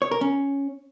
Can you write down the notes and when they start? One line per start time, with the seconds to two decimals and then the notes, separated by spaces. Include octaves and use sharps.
0.02 C#5
0.11 A#4
0.21 C#4